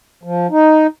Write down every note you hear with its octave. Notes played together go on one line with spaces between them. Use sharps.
F3
D#4